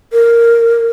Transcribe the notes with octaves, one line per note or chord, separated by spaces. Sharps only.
A#4